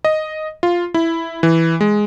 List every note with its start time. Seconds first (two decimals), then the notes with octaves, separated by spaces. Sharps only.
0.05 D#5
0.63 F4
0.94 E4
1.43 E3
1.81 G#3